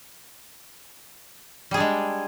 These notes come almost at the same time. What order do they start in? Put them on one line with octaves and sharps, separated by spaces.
G3 G#4 D4 G#3